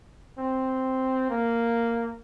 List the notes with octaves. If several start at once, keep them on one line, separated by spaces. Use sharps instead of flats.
C4
A#3